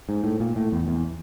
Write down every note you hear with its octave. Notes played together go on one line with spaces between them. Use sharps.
G#2
A2
A#2
A2
E2
E2